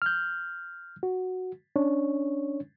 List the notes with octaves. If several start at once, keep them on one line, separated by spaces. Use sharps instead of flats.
F6 G6
F#4
C#4 D4 C#5